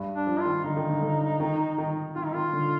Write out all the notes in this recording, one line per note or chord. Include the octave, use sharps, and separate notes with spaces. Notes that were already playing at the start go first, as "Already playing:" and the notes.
Already playing: G2
D4
F3
F4
D#3
D3 D#4
D#3
D3
D3
D#3
D#3
D#3 F4
D#4
D#3 F4
D3